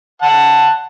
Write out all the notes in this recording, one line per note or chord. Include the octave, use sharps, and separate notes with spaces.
F#5 A5